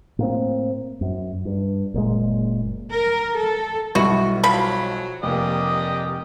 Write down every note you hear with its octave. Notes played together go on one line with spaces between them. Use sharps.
A2 A#3 C4
F#2
G2
F#1 A#2 G#3
A#4
A4
B1 G3 B3 E4 F#4
F3 F#3 B5
F1 A#3 G4 D5 D#5